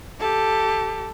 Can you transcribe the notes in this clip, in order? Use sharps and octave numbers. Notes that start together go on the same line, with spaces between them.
G4 A4